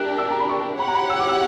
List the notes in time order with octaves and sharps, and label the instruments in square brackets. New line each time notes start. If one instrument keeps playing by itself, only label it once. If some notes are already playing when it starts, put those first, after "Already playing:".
Already playing: [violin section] D4 G4 A#4 [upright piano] E6 F#6
[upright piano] E6
A#5
B5
C#6
[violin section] G4 C#5 F#5 [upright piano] B5
[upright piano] A#5
B5
E6
D6
E6